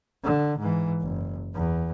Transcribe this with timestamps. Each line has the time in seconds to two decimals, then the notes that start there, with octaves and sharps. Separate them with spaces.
0.24 D3
0.59 G#2 E3
1.01 F#1
1.55 E2